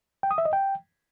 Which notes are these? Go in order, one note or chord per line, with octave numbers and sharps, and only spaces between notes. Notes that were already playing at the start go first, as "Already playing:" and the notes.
G5
D#6
E5
D#5
G5